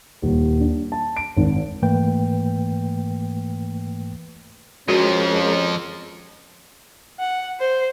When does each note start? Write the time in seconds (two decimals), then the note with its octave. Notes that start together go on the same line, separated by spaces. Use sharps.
0.22 D#1
0.60 D4
0.92 A5
1.17 D7
1.37 G#1
1.82 G#2 E3 A3 A#3 B4 G5
4.88 F2 F3 G#3 C#4 F#4 A#4
7.20 F#5
7.60 C5